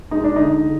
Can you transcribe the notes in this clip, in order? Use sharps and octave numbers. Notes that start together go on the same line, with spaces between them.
G#3 D#4
D4
D3 D#4
D3